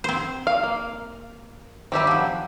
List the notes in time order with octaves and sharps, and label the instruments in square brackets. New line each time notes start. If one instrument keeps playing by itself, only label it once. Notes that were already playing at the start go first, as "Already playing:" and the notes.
[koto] C4 C5
[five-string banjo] F5
A#3
[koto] D#3 G3 [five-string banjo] C4 G4 E5
[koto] F3 F#3